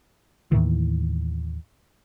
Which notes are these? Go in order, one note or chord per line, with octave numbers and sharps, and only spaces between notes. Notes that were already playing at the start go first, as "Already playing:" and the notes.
D#2 A2 D#3 E3